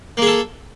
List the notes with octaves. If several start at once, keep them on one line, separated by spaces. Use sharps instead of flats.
A#3 G#4 A4